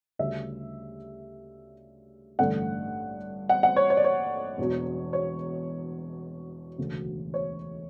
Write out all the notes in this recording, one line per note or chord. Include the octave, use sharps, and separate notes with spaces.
D2 C#3 G3 E5
A1 G2 D3 A3 F#5
F#5
F#5
C#5
C#5
D5
C#5
E1 E2 B2 F#3
C#5
E1 D2 C#3 F#3
C#5